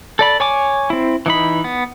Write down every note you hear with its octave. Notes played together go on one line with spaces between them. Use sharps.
A4 D5 B5
C#5 G#5 D6
C4 E4
E3 D#4 B5
B3